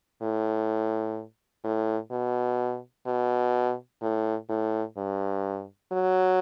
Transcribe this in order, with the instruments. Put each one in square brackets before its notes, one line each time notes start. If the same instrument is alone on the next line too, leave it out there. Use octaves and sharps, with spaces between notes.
[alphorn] A2
A2
B2
B2
A2
A2
G2
F#3